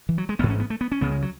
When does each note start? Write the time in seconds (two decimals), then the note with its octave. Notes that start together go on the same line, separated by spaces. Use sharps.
0.09 E3
0.18 F#3
0.29 G#3
0.39 A1 G#2 B3
0.49 C#4
0.60 B3
0.70 A3
0.81 B3
0.92 C#4
1.01 C#2 C#3 B3
1.11 G#3
1.22 F#3